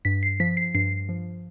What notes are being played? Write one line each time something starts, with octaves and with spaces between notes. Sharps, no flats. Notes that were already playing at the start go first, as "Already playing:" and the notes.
G2 B6
C7
F3 B6
C7
G2 C7
F3